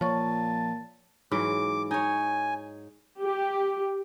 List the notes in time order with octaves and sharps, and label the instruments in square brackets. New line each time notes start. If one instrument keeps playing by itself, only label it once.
[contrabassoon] A#2 [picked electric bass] F3 [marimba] C#5 C#6 [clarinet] A5
[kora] G#2 E3 F#3 [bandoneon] D6
[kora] D#4 C#5 [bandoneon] G#5
[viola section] G4